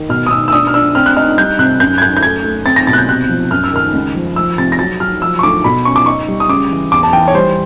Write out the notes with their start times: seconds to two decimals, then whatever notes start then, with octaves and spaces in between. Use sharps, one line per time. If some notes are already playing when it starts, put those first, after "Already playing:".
Already playing: D#3
0.09 B2 F6
0.26 D#6
0.31 B2 E6
0.48 E6
0.52 D4 D#6
0.67 F6
0.74 D4 E6
0.95 C4 F6
1.06 F#6
1.17 D#4 F6
1.38 G3 G6
1.59 C3 F#6
1.80 F#2 G6
1.98 G#6
2.02 F#2 G6
2.17 G6
2.23 A3 G#6
2.45 A3
2.66 C4 A6
2.76 A#6
2.87 B2 A6
2.93 F#6
2.98 G6
3.08 C3 F#6
3.29 F3
3.51 F#2 F6
3.64 E6
3.73 D#3 F6
3.94 C#2
4.15 F3
4.36 F3 E6
4.58 C3 A6
4.72 A#6
4.79 F#3 A6
5.00 F#3 F6
5.22 F3 E6
5.39 C#6
5.43 D2 D6
5.64 B2 B5
5.85 C#4 C#6
5.96 D6
6.06 D#4 C#6
6.28 G3
6.40 D#6
6.49 C#3 D6
6.71 E3
6.92 E2 D6
7.03 A5
7.13 E3 G5
7.28 C#5
7.35 G3 C5